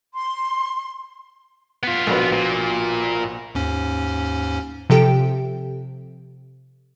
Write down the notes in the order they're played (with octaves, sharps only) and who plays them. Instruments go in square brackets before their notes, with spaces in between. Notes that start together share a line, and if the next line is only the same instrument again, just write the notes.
[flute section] C6
[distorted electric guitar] B3 F4
[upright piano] A#1 B2 B4
[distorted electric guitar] A#2
[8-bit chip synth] D#2 G#2 C#4
[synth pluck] C3 F3 G4 A4 G5 D7